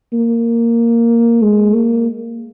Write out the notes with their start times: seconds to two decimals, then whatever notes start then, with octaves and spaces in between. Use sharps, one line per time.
0.13 A#3
1.42 G#3
1.74 A#3